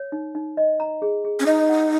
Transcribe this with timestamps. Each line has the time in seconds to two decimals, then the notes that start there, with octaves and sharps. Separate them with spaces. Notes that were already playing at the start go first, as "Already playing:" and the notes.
Already playing: C#5
0.12 D#4
0.35 D#4
0.57 D#5
0.80 A#5
1.02 G#4
1.24 G#4
1.40 C#4
1.46 D#4 D#5
1.69 F#5